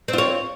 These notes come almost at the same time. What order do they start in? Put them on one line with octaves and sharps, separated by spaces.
C4 F4 C#5